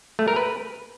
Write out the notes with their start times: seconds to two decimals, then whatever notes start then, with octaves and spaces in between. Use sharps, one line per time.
0.19 A3
0.28 A#4
0.36 B4